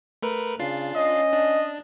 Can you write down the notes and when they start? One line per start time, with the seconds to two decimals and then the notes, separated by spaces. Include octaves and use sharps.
0.23 A3 A#4 B4
0.60 C#3 D4 F4 C7
0.96 C#4 D#5
1.33 D4